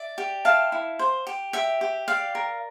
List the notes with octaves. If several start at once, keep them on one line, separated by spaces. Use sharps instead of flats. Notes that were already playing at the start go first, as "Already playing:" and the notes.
Already playing: D5 E5
G4
E4 F5 A5
E4
C5
G4
G4 E5 G5
G4
D5 F5
A#4